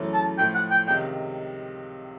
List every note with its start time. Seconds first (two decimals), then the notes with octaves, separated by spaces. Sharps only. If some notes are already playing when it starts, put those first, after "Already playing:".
Already playing: F#2 C#3 E3 A3 C#4
0.14 A5
0.38 A2 F3 A3 G5
0.55 F#5
0.71 G5
0.87 C#2 C3 D#3 G5